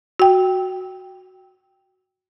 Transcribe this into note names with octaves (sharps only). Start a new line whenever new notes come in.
F#4 G5